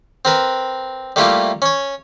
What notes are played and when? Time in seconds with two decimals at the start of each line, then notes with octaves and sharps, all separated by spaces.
0.25 C4 A#4 B4
1.16 G3 A3 A#3 E4 F4 G4
1.62 C#4 C#5